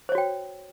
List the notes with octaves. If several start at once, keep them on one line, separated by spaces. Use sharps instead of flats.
F#4 C5 C#5 G5